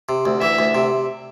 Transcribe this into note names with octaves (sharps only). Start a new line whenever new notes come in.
C3
D2
E3 E5
D2
C3